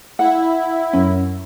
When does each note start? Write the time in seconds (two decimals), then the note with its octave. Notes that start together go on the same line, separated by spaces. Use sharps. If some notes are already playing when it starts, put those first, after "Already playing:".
0.19 E4 F#5
0.93 F#2 C#4